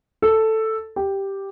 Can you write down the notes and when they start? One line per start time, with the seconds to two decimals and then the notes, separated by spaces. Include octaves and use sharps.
0.22 A4
0.96 G4